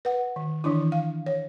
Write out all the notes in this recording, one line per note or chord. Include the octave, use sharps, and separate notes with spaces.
B4 F#5
D#3
D#3 E3 D4 E4
F5
C#5